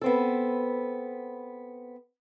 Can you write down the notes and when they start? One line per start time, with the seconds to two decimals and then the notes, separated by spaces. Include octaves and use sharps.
0.01 B3 C4 A4